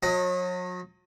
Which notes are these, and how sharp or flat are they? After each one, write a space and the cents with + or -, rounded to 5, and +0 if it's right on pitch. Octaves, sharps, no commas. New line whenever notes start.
F#3 -40 D#5 +10